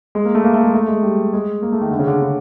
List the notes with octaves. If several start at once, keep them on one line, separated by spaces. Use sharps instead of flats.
G#3
A#3
A3
A#3
A3
G#3
A3
G#3
G3
G#3
A#3
A3
D#3
D3
C#3
D3
C#3